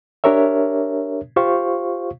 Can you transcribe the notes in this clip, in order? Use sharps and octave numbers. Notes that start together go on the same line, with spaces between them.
D4 G4 A#4 C#5 E5
F4 G4 C5 F5 C#6